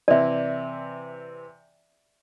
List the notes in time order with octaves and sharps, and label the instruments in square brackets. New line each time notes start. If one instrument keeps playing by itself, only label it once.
[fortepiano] C3 E3 [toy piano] D5 E5